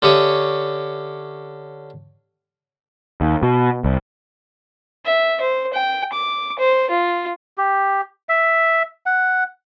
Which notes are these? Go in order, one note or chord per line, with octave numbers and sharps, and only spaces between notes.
D3 C#4 G4 C#5 E5 D#6
D#2
B2
C2
E5
C5
G5
D6
C5
F4
G4
E5
F#5